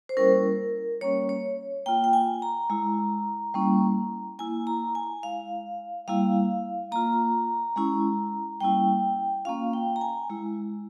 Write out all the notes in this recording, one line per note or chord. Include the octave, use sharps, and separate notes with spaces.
C5
G3 A#3 C#4 E4 A#4
G3 A#3 C#4 C#5
C#5
A#3 F4 G5
G5
G#5
A#5
G#3 E4
G3 A#3 C#4 E4
A#3 E4 G#5
A#5
G#5
G#3 E4 F5
G3 A#3 E4 F5
A#3 F4 A#5
G#3 C#4 E4
G3 A#3 C#4 E4 G5
A#3 C#4 F4 F5
G5
A#5
G#5
G#3 E4